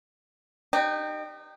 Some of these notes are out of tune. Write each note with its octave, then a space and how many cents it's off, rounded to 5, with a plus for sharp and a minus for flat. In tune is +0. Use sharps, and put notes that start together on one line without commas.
D#4 -30 G4 +0